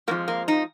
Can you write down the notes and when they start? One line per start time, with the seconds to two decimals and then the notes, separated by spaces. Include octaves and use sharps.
0.07 F2 D3 F3 G#3 A#3
0.28 A#3
0.48 D#4